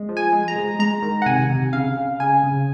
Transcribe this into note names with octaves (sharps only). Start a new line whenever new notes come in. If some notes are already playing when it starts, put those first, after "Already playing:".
Already playing: G#3
F3
G#5
G#3
A#5
G#3
G#3 A#5
D#3
F#5
C3 G#5
C3
C#3 F5
C#3
C#3 G#5
C#3